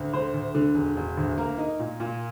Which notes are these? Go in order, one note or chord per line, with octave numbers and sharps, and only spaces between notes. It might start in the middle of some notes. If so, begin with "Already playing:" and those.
Already playing: D2
D3 C5
D2
D3
E1
E1
D2
A#3 A#4
D#4
A#2
A#2